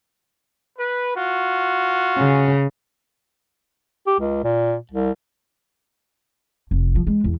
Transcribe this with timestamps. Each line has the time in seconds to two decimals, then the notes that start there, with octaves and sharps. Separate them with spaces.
0.79 B4
1.16 F4 F#4
2.18 C#3
4.07 G4
4.20 C#2
4.44 A#2
4.91 C2
6.71 F1
6.95 F3
7.07 G#3
7.24 E2